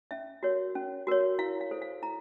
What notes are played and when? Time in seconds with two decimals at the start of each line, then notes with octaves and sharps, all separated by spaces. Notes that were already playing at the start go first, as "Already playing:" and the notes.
0.11 C#4 E5
0.43 F#4 A#4 C#5
0.75 C#4
1.07 F#4 A#4 C#5
1.39 E4 F5
1.61 F5
1.71 A4 C5
1.82 F5
2.02 E4 A#5